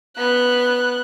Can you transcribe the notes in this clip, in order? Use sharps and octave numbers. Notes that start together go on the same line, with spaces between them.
B3 F#6